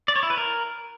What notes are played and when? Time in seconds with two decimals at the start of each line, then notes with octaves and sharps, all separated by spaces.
0.08 D5
0.16 C#5
0.23 E4
0.30 B4
0.37 A#4